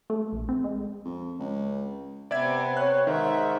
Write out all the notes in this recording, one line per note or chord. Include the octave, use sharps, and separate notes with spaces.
A3
A#1
C4
G#3
F2
C#2
C3 B3 C4 D5 E5 G#6
C#5 F#6
G#2 D#3 E5